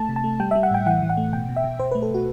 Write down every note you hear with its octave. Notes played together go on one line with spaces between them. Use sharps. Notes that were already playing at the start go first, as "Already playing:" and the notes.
Already playing: A3 A5
C3
A5
A3
G3 G5
E5
G3
F#5
A2 G5
E3 F#5
E3
F#5
A3
B2 G5
B2
E5
B2
B2 C5
B4
A3
A4
B2 F#4